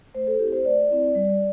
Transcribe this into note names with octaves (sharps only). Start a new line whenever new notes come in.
A3 C5
A4
C4 E4 G4
C5
A3 D5
C4 E4
G3